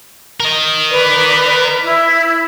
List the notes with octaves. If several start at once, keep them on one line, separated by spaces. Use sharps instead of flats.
A#4 D#5
B4 D5
E4